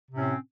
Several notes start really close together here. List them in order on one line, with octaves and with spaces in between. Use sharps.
C3 A2 C#4 C4